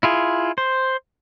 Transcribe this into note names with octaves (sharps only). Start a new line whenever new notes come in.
E4 F4 G#4
C5